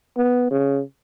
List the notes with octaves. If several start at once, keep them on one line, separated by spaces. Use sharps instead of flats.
B3
C#3